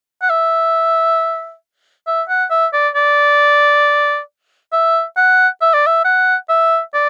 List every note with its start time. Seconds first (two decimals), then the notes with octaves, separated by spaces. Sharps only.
0.22 F#5
0.30 E5
2.07 E5
2.29 F#5
2.51 E5
2.73 D5
2.95 D5
4.72 E5
5.17 F#5
5.61 E5
5.74 D5
5.86 E5
6.05 F#5
6.49 E5
6.94 D5